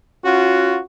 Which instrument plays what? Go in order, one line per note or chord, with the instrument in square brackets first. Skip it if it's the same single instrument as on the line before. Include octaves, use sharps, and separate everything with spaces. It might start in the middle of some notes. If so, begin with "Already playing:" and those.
[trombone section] C#4 F4 F#4